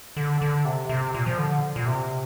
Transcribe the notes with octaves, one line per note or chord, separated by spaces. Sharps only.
D3
D3
C3
C3
A#2
F3
D3
A#2
C3